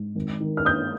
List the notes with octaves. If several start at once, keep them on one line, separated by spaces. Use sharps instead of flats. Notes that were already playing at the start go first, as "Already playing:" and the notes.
Already playing: G#2
G#1
D#3
F6
A#3 D#6 G6